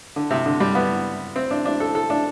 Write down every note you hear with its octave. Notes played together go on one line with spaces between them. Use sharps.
D3
C3
D3
G3
B3
C4
D4
D4
A4
A4
D4